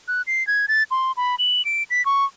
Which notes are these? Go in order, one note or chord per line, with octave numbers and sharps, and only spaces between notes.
F#6
C7
G#6
A6
C6
B5
F#7
D7
B6
C#6